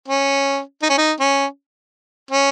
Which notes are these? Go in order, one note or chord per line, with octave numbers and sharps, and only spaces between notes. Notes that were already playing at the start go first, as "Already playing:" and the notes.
C#4
D#4
C#4
D#4
C#4
C#4